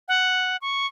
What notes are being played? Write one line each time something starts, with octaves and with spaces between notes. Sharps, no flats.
F#5
C#6